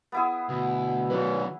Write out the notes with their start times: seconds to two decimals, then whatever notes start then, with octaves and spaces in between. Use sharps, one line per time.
0.12 B3 E4 G#4
0.49 D2 B2
1.10 D#3 F#3 C#4 F#4 B4